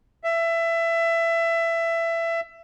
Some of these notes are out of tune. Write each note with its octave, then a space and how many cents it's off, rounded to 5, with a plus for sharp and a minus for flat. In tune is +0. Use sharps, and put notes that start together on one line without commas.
E5 +20